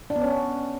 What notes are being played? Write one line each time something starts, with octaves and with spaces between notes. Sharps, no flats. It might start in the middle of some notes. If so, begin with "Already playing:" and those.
D4
B3
C#4